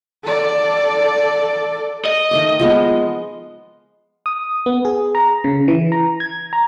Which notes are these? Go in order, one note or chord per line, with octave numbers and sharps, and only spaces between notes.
A4 D5
D#5
D#3 A3 D6
F3 G#3 B3
D#6
B3
G#4
A#5
C#3
E3
A#5
G#6
A#5